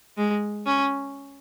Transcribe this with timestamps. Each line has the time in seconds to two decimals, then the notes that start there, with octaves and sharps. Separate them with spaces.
0.17 G#3
0.66 C#4